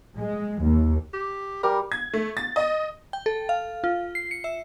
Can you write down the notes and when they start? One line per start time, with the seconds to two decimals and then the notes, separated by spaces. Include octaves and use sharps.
0.18 G#3
0.62 D#2
1.14 G4
1.63 G3 G4 A#4 B4
1.92 G#6
2.14 A3
2.37 A6
2.56 D#5
3.13 G5
3.26 A4
3.49 F5
3.84 F4
4.15 C7
4.31 C#7
4.44 E5